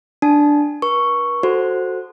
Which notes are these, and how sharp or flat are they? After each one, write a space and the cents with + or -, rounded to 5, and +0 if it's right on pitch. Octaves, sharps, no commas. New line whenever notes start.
D4 +0 A5 -20
B4 -45 C#6 +0
F#4 -5 A4 +0 C5 +0